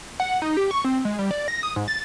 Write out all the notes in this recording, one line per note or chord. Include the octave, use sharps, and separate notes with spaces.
F#5
D#4
G4
C#6
C4
G#3
G3
D5
A#6
D#6
G#2
A6